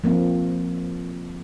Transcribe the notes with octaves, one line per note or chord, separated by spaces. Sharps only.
F3 A#3 C4